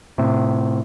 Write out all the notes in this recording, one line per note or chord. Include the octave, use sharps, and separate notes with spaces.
A2 C3